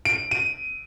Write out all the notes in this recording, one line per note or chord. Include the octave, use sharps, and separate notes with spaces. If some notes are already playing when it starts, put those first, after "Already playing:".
D7
D#7